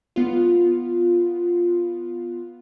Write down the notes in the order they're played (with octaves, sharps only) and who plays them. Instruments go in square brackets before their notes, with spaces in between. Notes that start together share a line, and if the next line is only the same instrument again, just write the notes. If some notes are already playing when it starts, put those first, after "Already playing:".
[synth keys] B3 F4